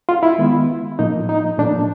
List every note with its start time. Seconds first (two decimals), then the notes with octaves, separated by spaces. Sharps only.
0.09 F4
0.23 E4
0.38 D#3 G#3 B3
0.99 A2 F3 A#3 D#4
1.29 D#4
1.58 A2 F3 A#3 D4